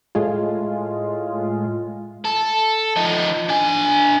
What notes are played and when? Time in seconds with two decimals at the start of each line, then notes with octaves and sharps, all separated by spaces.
0.15 A2 G#3 F4
2.25 A4
2.96 F3 D#4
3.49 D4 G#5